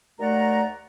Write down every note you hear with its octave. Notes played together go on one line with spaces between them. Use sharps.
D#2 A3 D5 F#5 A#5